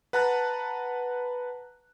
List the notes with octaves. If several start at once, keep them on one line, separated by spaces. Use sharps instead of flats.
B4 F#5 A5 A#5 F#6